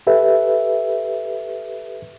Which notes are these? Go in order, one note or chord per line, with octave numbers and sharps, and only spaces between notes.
G4 A4 B4 E5